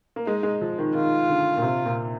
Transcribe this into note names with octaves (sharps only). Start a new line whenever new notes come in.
A#3
G#3 D#4
G#3
F3
D#3
D#3 F4
D3
A#2
C3
A#2